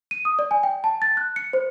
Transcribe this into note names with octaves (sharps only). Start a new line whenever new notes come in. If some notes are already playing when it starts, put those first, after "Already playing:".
D#7
D#6
D5
G#5
G5
A5
A6
F#6
C#7
C5